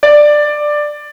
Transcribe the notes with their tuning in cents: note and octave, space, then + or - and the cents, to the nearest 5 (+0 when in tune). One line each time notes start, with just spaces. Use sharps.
D5 +10